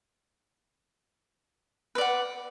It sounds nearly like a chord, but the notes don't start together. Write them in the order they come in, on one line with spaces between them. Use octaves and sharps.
B4 D5 F#5